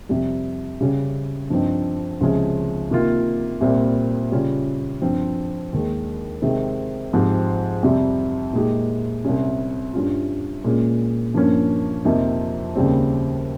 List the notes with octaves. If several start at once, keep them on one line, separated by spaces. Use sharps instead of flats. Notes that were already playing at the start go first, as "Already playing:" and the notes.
F2 C3 G3
C#3 G3 C#4 G4
G2 F3 C4 D#4
C#2 C3 F3 G#3 C#4
C3 D#3 A#3 F4
C2 A#2 G3 C4
C#3 G3 C#4 F4
G2 F3 C4 F4
D#2 D#3 G#3
C3 D#3 G#3 C4
G#2 F3 C4 G4
F2 C3 G3
A#2 G#3 D#4 G4
C2 C3 G3 C#4
G2 G3 C#4 F4
A#2 G#3 C#4 F4
G2 F3 A#3 C#4
F2 C3 F3 A#3 D#4
D#2 C#3 G3 C4